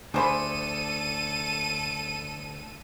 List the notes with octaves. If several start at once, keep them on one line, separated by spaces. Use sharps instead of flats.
D2 G#4 A4 C5 B5 D#7